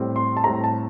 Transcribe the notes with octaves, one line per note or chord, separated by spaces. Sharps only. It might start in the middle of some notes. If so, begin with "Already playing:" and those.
Already playing: A2 G3 C4
C6
A5
A2 G3 C4 A#5
A5